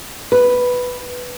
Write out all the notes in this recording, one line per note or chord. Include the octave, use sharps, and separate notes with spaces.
B4